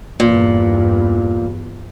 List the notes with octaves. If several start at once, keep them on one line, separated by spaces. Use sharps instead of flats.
E2 G2 A#2